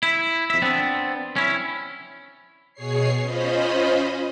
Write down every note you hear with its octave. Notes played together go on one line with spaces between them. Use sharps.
E4
F2 E5
B3 C4 D4
C#4 E4
B2 G#4 C#5 C7
C#4 F4 C5 D#5 B5